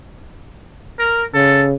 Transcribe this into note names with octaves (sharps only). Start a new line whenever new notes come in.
A#4
C#3 A4